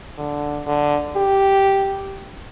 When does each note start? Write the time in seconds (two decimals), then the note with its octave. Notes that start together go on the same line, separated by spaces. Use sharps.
0.18 D3
0.67 D3
1.16 G4